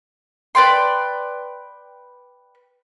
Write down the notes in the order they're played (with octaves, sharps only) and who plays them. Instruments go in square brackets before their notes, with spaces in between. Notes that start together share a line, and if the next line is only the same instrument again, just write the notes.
[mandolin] B4 D5 G5 C6